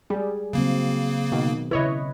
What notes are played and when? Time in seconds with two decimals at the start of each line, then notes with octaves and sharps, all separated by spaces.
0.10 G3 G#4
0.53 C#3 F#3 A#3 C4
1.32 B2 D#3
1.71 C#3 E4 B4 C#5 D#5